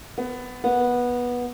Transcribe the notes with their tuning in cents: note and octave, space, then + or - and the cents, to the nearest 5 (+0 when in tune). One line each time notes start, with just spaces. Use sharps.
B3 +15
B3 -15